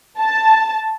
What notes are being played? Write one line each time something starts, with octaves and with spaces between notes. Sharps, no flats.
A5